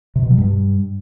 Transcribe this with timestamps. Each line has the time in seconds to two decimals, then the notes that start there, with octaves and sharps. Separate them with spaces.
0.16 C3
0.23 B2
0.30 F#3
0.38 G2